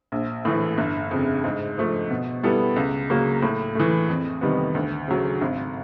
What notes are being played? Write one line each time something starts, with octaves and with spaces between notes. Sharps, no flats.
A#1
A2 E3
G1
F2 C#3
G#2
F3 A3
B2
G3 B3 E4 A4
C#2
C#3 F#3 A#3
A2
E3 A3
F2
C3 D#3 G3 B3
D2
C#3 F#3
G#1